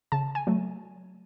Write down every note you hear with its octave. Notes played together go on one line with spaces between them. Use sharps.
C#3 A5
G#5
F#3 A3